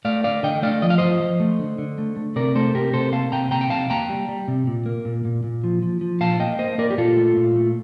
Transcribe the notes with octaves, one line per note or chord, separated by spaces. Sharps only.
A3 D5 F5
D3 D5 F5
D3 D#5 G5
A3 D5 F5
F3 D#5
F5
F3 C5 D#5
F3
A3
D3
D3
A3
A3
C3 A#4 D5
A3 A4 C5
C3 G4 A#4
C3 A4 C5
A#3 F5 A5
C3 G5 A#5
C3 G5 A#5
G5
C3 F5 A5
A#3 G5 A#5
G3
G3
C3
A#2
A#3
A#2
A#2
A#2
F3
F3
F3
A#2 F5 A5
A#3 D#5 G5
A#3 C5 D#5
A#3 A#4 D5
G4
A#2 F4 A4
A3
A#2
A3